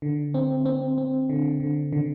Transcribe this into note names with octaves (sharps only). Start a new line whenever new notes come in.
D3
C4
C4
C4
D3
D3
D3